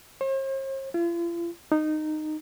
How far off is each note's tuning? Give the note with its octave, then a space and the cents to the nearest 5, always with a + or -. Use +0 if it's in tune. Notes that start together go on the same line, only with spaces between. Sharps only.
C5 +45
F4 -45
D#4 -15